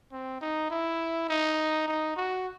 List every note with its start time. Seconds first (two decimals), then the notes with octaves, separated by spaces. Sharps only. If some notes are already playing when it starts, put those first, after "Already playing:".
0.12 C4
0.41 D#4
0.70 E4
1.29 D#4
1.88 D#4
2.16 F#4